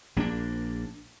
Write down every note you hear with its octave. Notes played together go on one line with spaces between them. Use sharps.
A#1 A#3 C#4 D4